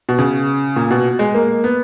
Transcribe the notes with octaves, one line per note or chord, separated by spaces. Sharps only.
B2
C#3
A#2
B2
G#3
A#3
B3